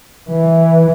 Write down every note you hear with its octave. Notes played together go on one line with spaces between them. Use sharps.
E3